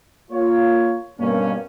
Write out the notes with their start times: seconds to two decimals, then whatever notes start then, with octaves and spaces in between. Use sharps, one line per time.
0.31 A#3 F4 C#5
1.20 G2 B2 A#3 C#4